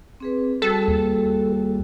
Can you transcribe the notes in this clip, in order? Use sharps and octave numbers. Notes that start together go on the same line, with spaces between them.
C4 G#4 B4
G3 F#4 G#4 A4
D#2